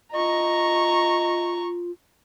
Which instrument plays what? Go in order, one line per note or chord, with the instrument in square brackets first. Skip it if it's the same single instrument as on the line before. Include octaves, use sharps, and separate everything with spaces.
[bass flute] F4 [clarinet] D#5 [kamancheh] A#5 C#6